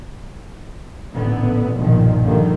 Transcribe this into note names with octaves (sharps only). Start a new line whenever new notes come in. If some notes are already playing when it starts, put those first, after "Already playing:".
A1 A#2 D3 E3 B3
B1 G2 A#2 D#3 F3
D3 D#3 F3 G3 A#3